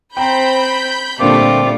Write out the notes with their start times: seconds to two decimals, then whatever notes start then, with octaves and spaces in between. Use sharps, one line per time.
0.17 C4 C5 G5 A#5 B5 G6
1.20 A#2 D3 G3 A3 A#3 C4 F4 D6